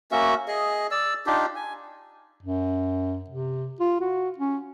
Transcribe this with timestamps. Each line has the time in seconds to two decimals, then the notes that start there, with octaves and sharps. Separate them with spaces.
0.12 A#3 C#4 F#4 E5
0.48 G#4 D#5
0.91 D5 E6
1.26 D4 D#4 F4 G4
1.56 G#5
2.43 F#2
3.30 C3
3.80 F4
4.00 F#4
4.38 C#4